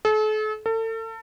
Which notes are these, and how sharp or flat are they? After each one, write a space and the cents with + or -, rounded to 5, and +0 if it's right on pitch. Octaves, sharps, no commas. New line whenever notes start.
A4 -40
A4 +35